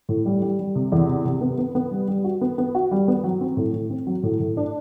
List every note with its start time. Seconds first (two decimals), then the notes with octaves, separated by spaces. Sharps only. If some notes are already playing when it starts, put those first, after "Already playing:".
0.09 A2
0.25 G3
0.42 G3
0.59 G3
0.76 C3
0.92 E2
1.09 C3
1.25 C3
1.41 B3
1.58 B3
1.75 B3
1.91 G3
2.08 G3
2.24 F#4
2.41 B3
2.58 B3
2.75 F#4
2.91 G3
3.08 B3
3.24 F#3
3.41 C4
3.57 A2
3.73 A2
3.90 C4
4.07 F#3
4.23 A2
4.40 A2
4.57 D4